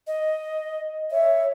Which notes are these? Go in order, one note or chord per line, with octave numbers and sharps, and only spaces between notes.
D#5
C#5 E5